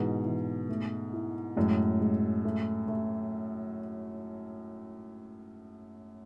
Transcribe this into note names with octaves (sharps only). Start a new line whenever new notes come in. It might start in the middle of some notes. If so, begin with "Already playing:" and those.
Already playing: G#2 B2 E3
E3
A3
E4
F#2 A2 G#3
G#3
A3
A3